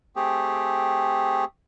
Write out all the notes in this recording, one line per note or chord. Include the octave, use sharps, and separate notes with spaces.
A3 C4 G4 G#4